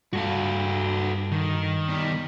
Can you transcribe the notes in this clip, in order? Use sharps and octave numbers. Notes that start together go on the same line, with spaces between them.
G2 F#4 A4 F5
D#3
B2 G3